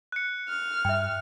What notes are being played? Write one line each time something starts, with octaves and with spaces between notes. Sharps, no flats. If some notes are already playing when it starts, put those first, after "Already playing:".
F#6 C#7
F6
G2 E5 G5